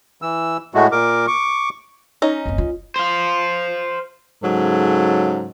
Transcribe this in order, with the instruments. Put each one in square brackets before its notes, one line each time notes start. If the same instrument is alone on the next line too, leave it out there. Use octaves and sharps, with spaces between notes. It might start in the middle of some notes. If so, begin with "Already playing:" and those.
[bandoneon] E3 E6
A2 G#3 A3 F#4
A#2 A#4 D6
C#6 D6
[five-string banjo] C#4 D#4 A#5
[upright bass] F#1 C4
F4
[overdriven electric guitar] C5 F5
[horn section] G#2 C#3 F#3 A4